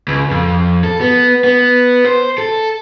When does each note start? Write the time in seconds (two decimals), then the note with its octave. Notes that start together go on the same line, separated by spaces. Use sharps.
0.08 C#2
0.31 F2
0.84 A4
1.01 B3
1.44 B3
2.05 C5
2.38 A4